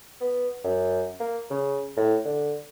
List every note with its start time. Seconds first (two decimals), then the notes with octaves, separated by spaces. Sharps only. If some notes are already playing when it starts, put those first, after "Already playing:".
0.20 B3
0.64 F#2
1.20 A#3
1.50 C#3
1.97 A2
2.25 D3